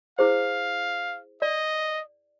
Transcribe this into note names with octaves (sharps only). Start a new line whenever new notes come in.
E4 G#4 C5 F5
D5 D#5